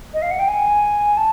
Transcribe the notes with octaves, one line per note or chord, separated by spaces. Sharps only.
D#5
F5
F#5
G5
G#5
A5